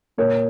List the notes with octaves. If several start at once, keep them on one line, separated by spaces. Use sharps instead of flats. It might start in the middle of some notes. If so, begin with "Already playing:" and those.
A#2 A#4 C#5